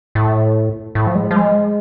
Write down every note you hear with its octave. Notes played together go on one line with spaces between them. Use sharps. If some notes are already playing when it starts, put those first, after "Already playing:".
A2
A2
F3
G#3
F3
G#3